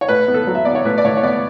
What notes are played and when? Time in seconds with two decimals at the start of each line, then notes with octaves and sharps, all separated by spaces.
0.01 C#5
0.08 A2 B4
0.28 B3
0.34 A4
0.47 F#3
0.55 E5
0.65 B3 D5
0.75 C#5
0.85 A2 B4
0.98 D5
1.04 A2 C#5
1.17 C#5
1.23 B3 D5